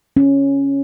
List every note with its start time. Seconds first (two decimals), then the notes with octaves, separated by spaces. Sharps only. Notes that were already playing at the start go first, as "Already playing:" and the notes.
0.17 C#4